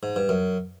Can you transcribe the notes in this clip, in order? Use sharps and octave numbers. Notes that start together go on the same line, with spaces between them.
G#2
G2
F#2